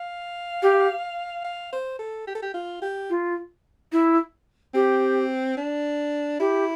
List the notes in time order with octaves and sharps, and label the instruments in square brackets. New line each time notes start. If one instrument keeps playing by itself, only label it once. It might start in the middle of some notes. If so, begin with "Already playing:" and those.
Already playing: [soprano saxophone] F5
[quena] G4
[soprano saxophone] F5
C5
A4
G4
A4
G4
F4
G4
[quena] F4
E4
[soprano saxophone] C4 [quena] G4
[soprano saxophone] D4
[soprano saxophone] E4 [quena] G4